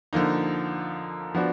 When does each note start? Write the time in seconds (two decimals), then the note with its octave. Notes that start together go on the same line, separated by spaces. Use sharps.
0.13 D3 F3 A#3 D#4
1.35 F3 B3 D4 F#4